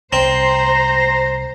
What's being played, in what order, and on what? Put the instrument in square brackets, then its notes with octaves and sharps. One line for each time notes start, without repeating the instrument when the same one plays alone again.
[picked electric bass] C2 [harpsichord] C4 [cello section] C5 [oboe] A#5